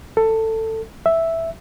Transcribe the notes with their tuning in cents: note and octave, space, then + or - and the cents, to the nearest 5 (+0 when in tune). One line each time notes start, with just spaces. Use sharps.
A4 +15
E5 +0